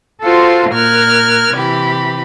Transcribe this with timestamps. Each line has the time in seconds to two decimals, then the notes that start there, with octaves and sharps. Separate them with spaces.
0.24 F4 F#4 A4 C5
0.72 A#2 A#4 F6 F#6 G#6
1.54 C3 E3 G4 B5